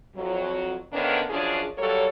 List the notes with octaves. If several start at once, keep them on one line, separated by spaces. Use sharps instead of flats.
F2 F#3
D3 D#3 A#3 B3 C#4 D4
F#2 F3 C#4 D4 G#4
F#3 G3 A#3 A4 C#5